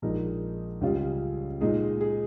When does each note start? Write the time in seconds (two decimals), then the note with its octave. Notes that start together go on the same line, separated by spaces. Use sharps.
0.02 A#1 A#2 G#3 D#4 A#4
0.81 C#2 C#3 G3 C#4 F4
1.61 A#2 G#3 D#4 G#4
2.01 G#4